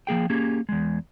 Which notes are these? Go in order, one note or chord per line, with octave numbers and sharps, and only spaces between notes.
F3 A#3 G#4 G5
A#3 C#4 G4 G#4
E2 G#3